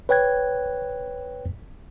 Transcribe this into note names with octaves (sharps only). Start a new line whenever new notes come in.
B4 C#5 G5 F#6 G#6